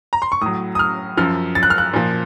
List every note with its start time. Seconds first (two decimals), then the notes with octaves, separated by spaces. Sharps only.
0.13 A#5
0.22 C6
0.32 C#6
0.41 A2 F#3 D#6
0.75 D#6
0.79 F6
1.17 F#2 F3 F6
1.55 A6
1.63 F#6
1.70 F6
1.78 F#6
1.93 A#2 F3